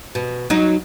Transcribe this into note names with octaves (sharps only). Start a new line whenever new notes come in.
B2
F#3 D#4